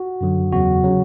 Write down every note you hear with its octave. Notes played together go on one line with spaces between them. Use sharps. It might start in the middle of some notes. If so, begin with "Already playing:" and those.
Already playing: F#4
F#2 D3 F#3
E2 C#3 F#3 F#4
C#3 F#3